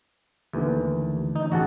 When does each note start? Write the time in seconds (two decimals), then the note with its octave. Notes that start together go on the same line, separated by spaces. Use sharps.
0.53 D#2 D3 E3 A3
1.36 D#4
1.52 A1 F#4 G#4 F#5 A5